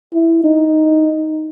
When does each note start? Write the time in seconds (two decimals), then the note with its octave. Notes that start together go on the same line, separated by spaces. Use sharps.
0.13 E4
0.44 D#4